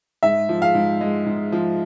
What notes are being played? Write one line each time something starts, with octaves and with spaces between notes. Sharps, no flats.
G#2 E5
F3
F5
G#2
G#3
G#2
F3